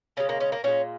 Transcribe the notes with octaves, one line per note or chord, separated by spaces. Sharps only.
C#3 G#3 C#4
A#3
C#4
A#3
A#2 G#3 C#4